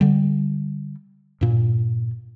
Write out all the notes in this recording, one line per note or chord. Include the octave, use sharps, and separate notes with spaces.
D3 G3
G2 A#2